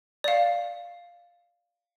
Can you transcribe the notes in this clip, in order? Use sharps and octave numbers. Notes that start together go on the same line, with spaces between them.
D5 F5